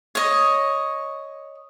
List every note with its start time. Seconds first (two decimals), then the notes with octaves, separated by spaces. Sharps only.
0.15 C#5 D#5